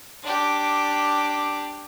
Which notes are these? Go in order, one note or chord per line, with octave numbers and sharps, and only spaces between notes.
D4 G4